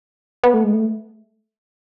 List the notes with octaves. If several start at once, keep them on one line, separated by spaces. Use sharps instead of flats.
B3
A3
G#3
A3